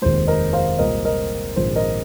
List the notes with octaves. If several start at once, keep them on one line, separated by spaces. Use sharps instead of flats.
F1 D#2 D#3 G#3 C5
A#4 D#5
C5 F5
C2 A#2 G#3 C4 A#4 D#5
A#4 D#5
A#1 G#2 D#3 C4 C5
A#4 D#5